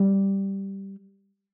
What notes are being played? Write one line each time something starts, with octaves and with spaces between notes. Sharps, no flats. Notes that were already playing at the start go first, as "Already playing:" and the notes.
Already playing: G3